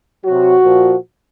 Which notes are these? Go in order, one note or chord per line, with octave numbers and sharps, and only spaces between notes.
C3 F#3 F#4
A#2 F3